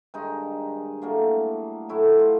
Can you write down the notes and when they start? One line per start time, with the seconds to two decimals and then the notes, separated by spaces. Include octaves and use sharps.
0.14 G2 D#3 G#3 D#4
1.02 A2 F#3 A#3 D4
1.89 A2 F#3 A3 E4
2.19 F4